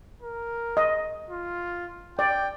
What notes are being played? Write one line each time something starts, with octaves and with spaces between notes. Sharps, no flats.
A#4
D#5
F4
D5 G5